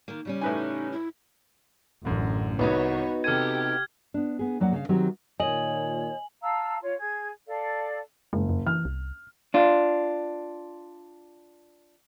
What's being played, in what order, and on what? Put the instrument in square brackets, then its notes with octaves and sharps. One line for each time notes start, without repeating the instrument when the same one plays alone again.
[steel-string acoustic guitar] D#3 A#3
C#3 G3 C#4
[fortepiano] A2 B4 G#5 [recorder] D#4
[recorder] E4
[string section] A1 [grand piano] F#2 D3
[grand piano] C2 [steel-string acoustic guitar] B3 D#4 F#4 [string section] B4 C#5
[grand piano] C3 A4 D#7 [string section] G4 [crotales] F6 G#6
[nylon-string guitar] B3 D4
B3 G#4
F2 F#3 A#3 D5 F#5
C#3 F5
D#3 F#3 C4 G4
[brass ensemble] A#2 D#3 [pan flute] C#5 [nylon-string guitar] D#5 [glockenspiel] G#5 F#7
[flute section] F5 A5 A#5 E6
F4 C#5
G#4 G#6
A4 D5 F5
[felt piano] F#1 [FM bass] G#3
[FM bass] F2
[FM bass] E3 [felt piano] F6
[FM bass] C2
[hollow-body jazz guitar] D4 F4